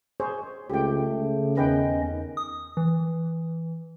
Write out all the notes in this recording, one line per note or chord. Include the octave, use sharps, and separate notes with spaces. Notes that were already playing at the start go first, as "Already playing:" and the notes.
G#4 C5 C#5
C#2 A3 G4 G5
C#3
E2 D#3 C#4 B4 D#5 G5
D#6
E3